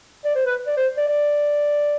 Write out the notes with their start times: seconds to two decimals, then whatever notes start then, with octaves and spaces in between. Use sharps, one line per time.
0.25 D5
0.35 C5
0.45 B4
0.67 D5
0.77 C5
0.97 D5
1.07 D5